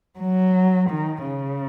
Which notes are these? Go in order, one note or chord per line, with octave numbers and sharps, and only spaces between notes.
F#3
D#3
C#3